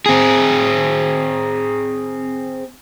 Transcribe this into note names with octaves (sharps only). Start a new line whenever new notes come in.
C4 G#4